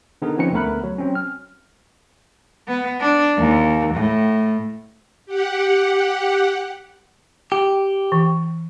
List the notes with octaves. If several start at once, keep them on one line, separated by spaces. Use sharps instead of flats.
D3 B3 D#4 G#4 A#4
F3 C4 C#4 D#4 B4 C#7
D2 A3 B3 A#4 B5 F#6
F#3
F#3 C4 C#4
F6
B3
D4
D#2
A2
G4 F#5
G4
E3